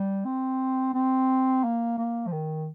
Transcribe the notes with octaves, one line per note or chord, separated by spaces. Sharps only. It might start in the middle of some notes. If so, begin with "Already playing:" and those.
Already playing: G3
C4
C4
A#3
A#3
F3
D#3